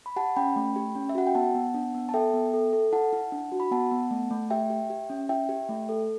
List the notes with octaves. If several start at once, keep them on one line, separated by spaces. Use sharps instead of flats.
B5
G4 F#5 A5
C#4 G5 B5
A3
G4
C#4
E5
F#4 F#5
G5
B3 F#5 A5
B3
D4
B3
A5
A4 E5 G5
B3
A4
A4
E4 F#5 A5
E4
D4
F#4
B5
B3 F#5 A5
B3
A3
A3
G4 E5 G5
G4
G4
C#4
E4 E5 G5
G4
A3
A4